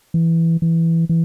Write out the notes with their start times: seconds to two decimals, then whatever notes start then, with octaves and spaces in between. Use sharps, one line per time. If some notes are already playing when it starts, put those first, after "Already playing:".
0.14 E3
0.62 E3
1.09 E3